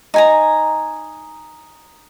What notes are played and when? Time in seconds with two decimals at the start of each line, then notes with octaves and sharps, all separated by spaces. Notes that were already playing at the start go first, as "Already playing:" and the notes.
0.14 D#4 G#5 A#5